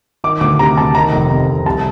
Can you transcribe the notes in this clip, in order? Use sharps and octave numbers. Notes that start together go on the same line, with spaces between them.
D#3 D6
D2 D6
C3 A#5
D2 A5
D#3 A#5
F1
F2
F1
C2 A5